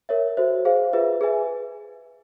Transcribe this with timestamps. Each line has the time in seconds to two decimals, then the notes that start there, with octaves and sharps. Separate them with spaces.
0.09 A#4 C#5 E5
0.37 F#4 A4 C5 E5
0.65 G#4 C5 F5
0.93 F4 G#4 B4 E5
1.21 G#4 B4 E5 G#5